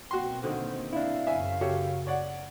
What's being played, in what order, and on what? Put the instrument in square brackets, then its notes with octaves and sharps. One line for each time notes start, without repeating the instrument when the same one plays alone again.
[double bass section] B2 A#3 C4 [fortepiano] F#4 C6 [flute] G5
[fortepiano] D3 D#3 [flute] C5
[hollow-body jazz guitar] D4 E4 [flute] F5
[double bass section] F#2 C#3 [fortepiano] E5 G#5
[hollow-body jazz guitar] F#4 [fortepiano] G4 A4 C#5
[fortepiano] C#5 D5 F#5